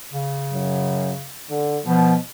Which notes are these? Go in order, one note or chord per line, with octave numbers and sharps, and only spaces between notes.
C#3
F#2
D3
B2 F3